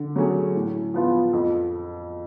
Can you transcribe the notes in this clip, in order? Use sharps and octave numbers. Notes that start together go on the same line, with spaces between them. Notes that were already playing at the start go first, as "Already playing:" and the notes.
Already playing: D3
F#3 A3 C#4 G#4
A2
F3 B3 F4
F2